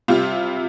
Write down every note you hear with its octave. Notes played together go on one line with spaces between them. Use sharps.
C3 G3 C4 F4